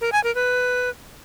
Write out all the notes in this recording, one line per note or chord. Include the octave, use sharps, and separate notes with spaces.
A#4
G#5
A#4
B4